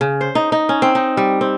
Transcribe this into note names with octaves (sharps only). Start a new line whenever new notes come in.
C#3
C5
D#4
D#4
C#4
C4
D#4
G3
C4